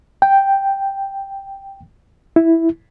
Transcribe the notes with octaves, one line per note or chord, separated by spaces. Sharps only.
G5
E4